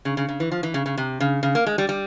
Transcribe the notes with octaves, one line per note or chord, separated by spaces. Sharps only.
C#3
C#3
C#3
E3
F3
E3
C#3
C#3
C3
C#3
C#3
A#3
G#3
G3
G3